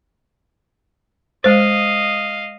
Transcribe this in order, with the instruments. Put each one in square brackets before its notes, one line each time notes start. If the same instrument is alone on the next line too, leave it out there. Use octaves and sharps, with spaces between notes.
[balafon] G#3 C5 [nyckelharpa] D#5 F5